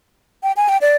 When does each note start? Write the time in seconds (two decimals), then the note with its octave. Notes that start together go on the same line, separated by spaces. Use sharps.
0.43 G5
0.56 G#5
0.69 G5
0.81 D5